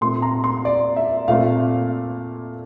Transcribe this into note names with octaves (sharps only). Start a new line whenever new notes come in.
A#2 A3 C4 C6
A#5
C6
D5
E5
A#2 A3 C4 F5